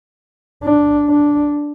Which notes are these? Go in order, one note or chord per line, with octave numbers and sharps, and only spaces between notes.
D4
D4